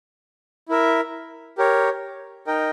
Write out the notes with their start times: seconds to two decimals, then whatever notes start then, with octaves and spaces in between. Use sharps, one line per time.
0.69 E4 A#4 E5
1.58 G4 A#4 C#5
2.47 D#4 A#4 D#5 G5